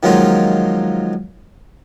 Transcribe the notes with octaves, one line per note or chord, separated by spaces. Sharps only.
D#3 F3 F#3 G#3 A#3 F4